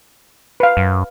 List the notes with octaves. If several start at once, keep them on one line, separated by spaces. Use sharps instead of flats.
B4 F5
F#2